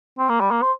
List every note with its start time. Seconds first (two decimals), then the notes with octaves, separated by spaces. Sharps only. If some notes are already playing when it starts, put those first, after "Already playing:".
0.18 C4
0.29 A#3
0.41 G3
0.51 A#3
0.62 C5